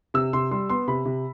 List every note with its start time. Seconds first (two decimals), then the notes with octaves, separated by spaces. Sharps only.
0.14 C3 E6
0.33 C3 C6
0.51 G3 C6
0.69 B3 C6
0.88 C3 B5
1.05 C3